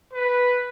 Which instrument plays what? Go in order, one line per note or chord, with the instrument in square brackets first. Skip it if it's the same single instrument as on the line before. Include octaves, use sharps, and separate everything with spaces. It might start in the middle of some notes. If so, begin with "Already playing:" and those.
[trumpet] B4